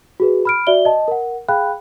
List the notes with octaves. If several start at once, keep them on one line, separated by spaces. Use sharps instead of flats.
F#4 G#4 B4
B5 F6 D7
F#4 D5 E5 G7
D#5 A5
A#4 F#5
G#4 F5 G5 B5 F#6